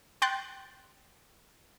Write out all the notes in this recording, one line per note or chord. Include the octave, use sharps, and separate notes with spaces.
G5 C6 F#6 G6 A6